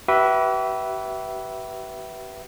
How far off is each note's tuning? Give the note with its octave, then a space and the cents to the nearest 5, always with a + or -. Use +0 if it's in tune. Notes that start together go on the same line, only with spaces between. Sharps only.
G4 -45 B4 -10 E5 +0